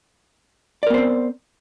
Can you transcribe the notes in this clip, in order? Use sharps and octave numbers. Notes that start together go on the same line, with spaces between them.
B3 C4 A#4 C5 D5